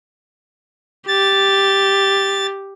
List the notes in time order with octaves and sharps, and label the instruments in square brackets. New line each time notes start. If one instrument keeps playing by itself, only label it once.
[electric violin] G4 [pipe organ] A6